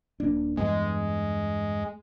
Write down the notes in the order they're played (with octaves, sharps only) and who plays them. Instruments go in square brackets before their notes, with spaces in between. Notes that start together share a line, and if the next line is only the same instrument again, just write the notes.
[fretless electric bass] D#1 A#3 D4
[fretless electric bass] E2 G2 B3 [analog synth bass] G#3